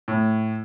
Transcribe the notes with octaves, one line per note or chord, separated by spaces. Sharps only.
A2